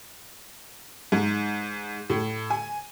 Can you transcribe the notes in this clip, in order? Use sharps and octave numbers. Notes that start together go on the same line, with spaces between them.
G#2
A2
G#5